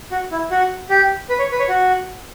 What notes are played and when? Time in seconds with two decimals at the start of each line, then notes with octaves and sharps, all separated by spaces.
0.11 F#4
0.32 E4
0.51 F#4
0.90 G4
1.29 B4
1.39 C#5
1.52 B4
1.59 C#5
1.69 F#4